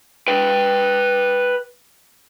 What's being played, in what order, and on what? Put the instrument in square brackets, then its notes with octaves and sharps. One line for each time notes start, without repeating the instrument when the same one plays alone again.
[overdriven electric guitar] B4 G5